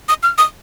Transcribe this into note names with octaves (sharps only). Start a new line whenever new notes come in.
D#6
F6
D#6